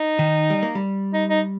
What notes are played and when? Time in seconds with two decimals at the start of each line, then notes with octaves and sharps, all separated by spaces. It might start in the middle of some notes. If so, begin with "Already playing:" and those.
Already playing: D#4
0.19 D#3
0.50 G3
0.63 A#3
0.75 G3
1.13 D#4
1.29 D#4